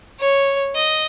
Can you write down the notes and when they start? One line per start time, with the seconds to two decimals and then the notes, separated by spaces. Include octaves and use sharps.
0.20 C#5
0.75 D#5